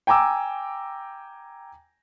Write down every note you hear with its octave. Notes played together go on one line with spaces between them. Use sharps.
G5 G#5 A#5 D6 E6